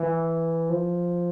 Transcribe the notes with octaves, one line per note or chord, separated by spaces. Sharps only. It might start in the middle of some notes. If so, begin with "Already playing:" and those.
Already playing: E3
F3